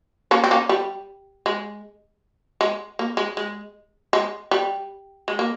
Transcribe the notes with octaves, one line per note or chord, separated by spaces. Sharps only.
A#3 C#4
C4
A#3 C#4
G3
G#3
G#3
A#3
G#3
G#3
G#3
G3
G#3
A#3